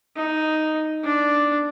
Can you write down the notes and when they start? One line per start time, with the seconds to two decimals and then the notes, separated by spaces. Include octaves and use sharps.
0.16 D#4
1.04 D4